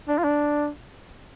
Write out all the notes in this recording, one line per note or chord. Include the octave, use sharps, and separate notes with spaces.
D4
F4
D4